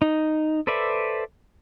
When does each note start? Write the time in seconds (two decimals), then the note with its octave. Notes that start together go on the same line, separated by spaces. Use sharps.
0.02 D#4
0.67 A4 B4 C5 D5 E5